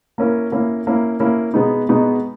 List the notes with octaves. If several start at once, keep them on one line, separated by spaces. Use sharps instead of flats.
A#3 C#4 E4 A#4
A#3 C#4 E4 A#4
A#3 C#4 E4 A#4
A#3 C#4 E4 A#4
B2 G#3 B3 D#4
B2 G#3 B3 D#4